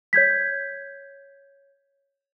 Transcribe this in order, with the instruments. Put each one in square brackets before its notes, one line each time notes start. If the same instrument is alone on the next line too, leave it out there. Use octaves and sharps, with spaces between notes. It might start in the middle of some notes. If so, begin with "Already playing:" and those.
[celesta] C#5 G6 G#6 B6